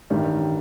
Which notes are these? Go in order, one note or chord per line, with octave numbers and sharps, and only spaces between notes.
A1 G2 D#3 G3